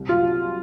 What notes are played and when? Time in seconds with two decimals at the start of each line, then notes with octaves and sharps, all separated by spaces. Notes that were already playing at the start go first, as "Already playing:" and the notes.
Already playing: C2
0.09 F#3 F4